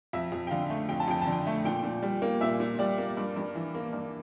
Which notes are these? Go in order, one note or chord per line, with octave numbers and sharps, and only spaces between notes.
F2 E5
F2
G5
D3 F5
A3
F2 G5
A5
F2 G5
A5
D3
G5
A3
A#2 G5
A#2
G3
A#3
A#2 E5
A#2
G3 D5
A#3
G2
G2
E3
A#3
G2